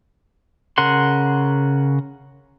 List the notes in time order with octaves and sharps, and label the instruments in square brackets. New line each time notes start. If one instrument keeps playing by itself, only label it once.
[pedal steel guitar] C#3 A#4 F#5 C6